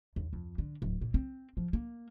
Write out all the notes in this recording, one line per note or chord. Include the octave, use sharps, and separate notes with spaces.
D#2
F2
D3
D1
A#2
C4
F3
A#3